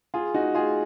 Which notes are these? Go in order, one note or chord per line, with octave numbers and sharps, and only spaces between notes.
F4 G#4
D#4 F#4
F4 G#4